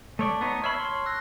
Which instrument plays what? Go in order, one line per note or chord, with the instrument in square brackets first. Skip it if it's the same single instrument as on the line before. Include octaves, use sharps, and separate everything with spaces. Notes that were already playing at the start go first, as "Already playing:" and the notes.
[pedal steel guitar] A3 C#5 D5 [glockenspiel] A5 C#6
[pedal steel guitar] B3 D#4 C#5
[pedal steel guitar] C#5 E5 B5 [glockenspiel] C#6 F6 C7
[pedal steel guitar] C#5 C6
[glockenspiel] E6 F#6 A#6